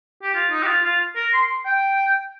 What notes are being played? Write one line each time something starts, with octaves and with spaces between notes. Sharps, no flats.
G4
F4
D#4
G4
F4
F4
A#4
C6
G5